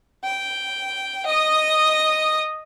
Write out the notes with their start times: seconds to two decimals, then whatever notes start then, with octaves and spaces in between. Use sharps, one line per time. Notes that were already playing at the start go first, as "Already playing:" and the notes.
0.24 G5
1.26 D#5 D#6